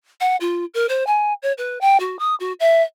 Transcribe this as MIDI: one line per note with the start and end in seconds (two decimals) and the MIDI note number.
0.21 0.36 78
0.41 0.65 65
0.74 0.86 70
0.89 1.06 72
1.07 1.33 80
1.43 1.53 73
1.58 1.79 71
1.81 1.98 79
2.00 2.19 66
2.19 2.35 87
2.40 2.53 66
2.60 2.82 76